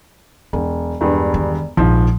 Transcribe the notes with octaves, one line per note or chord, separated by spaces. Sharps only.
E1 F#3
E1 G2
D#3
A#1 G#2 F3